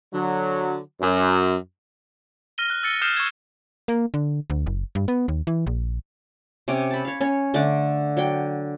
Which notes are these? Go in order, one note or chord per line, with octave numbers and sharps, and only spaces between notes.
D3 F#3
F#2
F6 A#6 D#7 G7
F#6
E6 A6 C#7 G7
D#6 F6 G6 C7 D#7 E7
C#6 F#6 G#6 E7
A#3
D3
D2
F#1
G2
B3
D#2
E3
A#1
C3 C#4 D6
A5 B5
C#5 F5
C#4 C#5
D3 A3 D4 D6
F#3 D5 G5